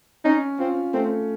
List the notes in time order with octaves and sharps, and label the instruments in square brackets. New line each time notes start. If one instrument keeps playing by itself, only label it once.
[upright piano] C#4 [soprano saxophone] D#4
[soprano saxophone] C4 [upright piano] F4
[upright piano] A3 [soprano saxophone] C4